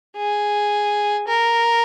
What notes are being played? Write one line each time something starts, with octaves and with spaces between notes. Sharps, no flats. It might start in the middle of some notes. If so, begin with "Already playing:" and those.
G#4
A#4